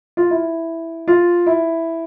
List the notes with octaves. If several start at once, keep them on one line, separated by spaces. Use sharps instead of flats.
F4
E4
F4
E4